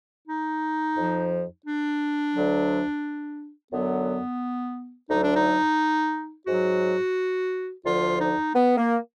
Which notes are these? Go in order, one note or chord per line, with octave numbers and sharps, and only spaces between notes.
D#4
F2 F3
D4
D2 D3 F#3
F#2 D3 F#3 B3
D2 D3 F#3 D#4
D4
D#4
G#2 F#3 F#4
D2 D3 F3 F4
D#4
B3
A#3